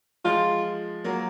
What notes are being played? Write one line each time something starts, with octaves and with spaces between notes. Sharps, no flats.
F3 G#3 F4
F#3 A#3